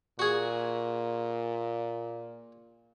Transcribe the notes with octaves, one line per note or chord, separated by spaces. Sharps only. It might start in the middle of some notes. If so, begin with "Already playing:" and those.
A#2 F#4 G#4